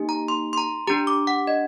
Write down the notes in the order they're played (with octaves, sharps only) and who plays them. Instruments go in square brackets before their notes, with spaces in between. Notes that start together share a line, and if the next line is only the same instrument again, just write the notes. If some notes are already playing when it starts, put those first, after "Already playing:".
Already playing: [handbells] A#3 D#4 G4
A#5
C6
C6
A#5
D4 G4 A#5
D6
F#5
D#5